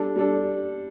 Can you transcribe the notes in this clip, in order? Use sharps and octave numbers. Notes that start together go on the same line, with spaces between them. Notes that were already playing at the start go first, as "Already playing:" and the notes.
Already playing: G3 D4 A4
G3 D4 A4